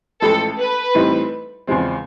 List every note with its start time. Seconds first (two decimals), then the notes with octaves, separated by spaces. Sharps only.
0.22 A1 A2 F3 G#3 A4
0.58 B4
0.95 A2 E3 G3 C4 D#4
1.67 E2 C#3 F3 G#3 C4